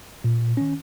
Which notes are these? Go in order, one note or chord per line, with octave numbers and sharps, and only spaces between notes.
A#2
D#3 C#4